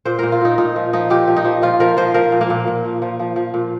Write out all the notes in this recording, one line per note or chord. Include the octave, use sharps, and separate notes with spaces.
A#2 C5
A#2 A#4
F4
A#2 D#4
A#2 D#4
F3
F3 D#4
A#2 G4
F3
D#4
F3
F3 F4
F3 A#4
F3 C5
F3 A#4
A#2
A#3
A#2
A#2
F3
F3
F3
F3
A#2